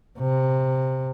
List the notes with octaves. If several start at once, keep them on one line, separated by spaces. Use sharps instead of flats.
C3